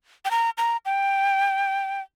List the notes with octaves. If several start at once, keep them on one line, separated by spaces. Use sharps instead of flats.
G5
A#5
A#5
G5